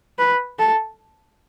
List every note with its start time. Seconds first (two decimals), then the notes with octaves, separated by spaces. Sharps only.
0.19 B4
0.59 A4